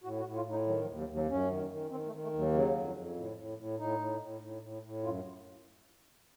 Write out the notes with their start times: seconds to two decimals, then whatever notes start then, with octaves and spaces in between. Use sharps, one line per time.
0.04 A2 F#4
0.20 F#4
0.25 A2
0.36 F4
0.46 A2 D#4
0.67 D#3 F#3
0.82 F3
0.88 D#2
0.97 F#3
1.08 D#2
1.14 F#3
1.29 F#2 C#4
1.49 D#3
1.70 D#3
1.91 D#3 C4
2.07 A3
2.12 D#3
2.23 A3
2.33 D#2
2.39 F#3
2.53 C#3 F#3
2.75 F2
2.95 F2
3.16 A2
3.37 A2
3.58 A2
3.79 A2 D#4
3.99 A2
4.21 A2
4.41 A2
4.62 A2
4.82 A2
5.03 F#2 F4